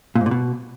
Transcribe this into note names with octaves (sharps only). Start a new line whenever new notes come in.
A#2
G#2
A#2
B2